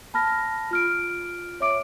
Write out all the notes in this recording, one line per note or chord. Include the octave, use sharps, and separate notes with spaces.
A5 B5 F6 A#6
F4 F6 D7
C#5 E5 D6 D7